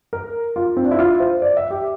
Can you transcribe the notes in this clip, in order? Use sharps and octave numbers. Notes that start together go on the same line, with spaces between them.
A#4
F4
C4
D4
E4
F4
C5
D5
E5
G4